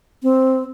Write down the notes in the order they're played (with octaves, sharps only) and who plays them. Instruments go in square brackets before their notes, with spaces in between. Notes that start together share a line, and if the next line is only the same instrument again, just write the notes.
[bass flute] C4